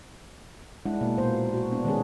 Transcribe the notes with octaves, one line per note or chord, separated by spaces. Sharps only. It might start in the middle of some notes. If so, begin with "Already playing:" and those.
G#3 D4 E4 F#5
B2 A#3
A#2 A#3 C5
F#4
B3 D4
D#3 G#3 C#4 G#4